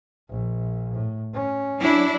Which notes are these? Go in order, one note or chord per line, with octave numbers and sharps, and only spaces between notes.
A#1
A2
C#4
F#3 D4 E4